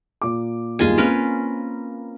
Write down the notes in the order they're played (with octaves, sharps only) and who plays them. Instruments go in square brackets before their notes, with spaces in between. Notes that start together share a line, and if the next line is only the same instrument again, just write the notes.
[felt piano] A#2 D6
[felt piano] G1 D#2 [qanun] G#3 F4 G#5
[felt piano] A#3 C4 [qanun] C#4 A#4 B4